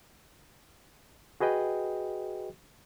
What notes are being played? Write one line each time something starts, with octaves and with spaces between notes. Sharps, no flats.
F#4 G#4 B4 D#5 G5